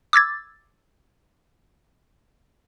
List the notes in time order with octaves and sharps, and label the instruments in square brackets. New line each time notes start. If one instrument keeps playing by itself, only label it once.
[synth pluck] D6 E6 G#6 A6